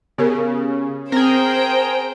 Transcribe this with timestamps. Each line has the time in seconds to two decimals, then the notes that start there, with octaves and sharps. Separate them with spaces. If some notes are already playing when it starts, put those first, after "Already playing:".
0.18 C#3 B3 G4 A#4
1.12 C4 G#4 A#4 C5 G5